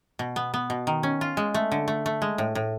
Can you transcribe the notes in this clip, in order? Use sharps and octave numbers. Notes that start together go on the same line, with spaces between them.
B2
B3
B3
B2
D#3
C#4
F4
G#3
A3
D3
A3
A3
G#3
A2
A2